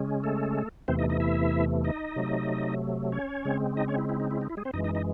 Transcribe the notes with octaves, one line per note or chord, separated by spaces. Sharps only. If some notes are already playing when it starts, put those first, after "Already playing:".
Already playing: C#3 G#3 C#4
A3 A4
E2 C3 E3 A3 C4 C5
D#4 D#5
D#4 D#5
E4 E5
D#4 D#5
C3 F#3 A3
C#4 C#5
C#3 G#3 C4
D#4 D#5
C#4 C#5
E4
E4
D#4
E4
D#4
E4
G#3 G#4
C4 C5
F#2 E3 G#3 D#4 D#5
D#4 D#5
D#4 D#5